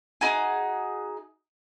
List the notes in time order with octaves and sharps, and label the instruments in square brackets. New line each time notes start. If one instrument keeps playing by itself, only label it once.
[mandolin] D#4 F#4 G#4